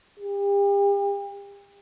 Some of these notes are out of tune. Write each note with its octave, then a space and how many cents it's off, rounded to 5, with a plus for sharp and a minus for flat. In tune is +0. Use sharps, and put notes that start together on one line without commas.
G4 +40